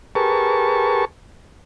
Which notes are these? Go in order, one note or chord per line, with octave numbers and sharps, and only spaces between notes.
G4 G#4 A#4 B4 A5 C#6